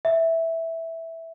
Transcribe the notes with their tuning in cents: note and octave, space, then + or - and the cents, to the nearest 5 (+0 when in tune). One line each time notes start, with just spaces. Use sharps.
E5 -5